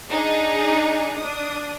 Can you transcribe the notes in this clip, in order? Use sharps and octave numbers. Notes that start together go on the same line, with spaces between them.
D4 D#4 G#4
D4 D#6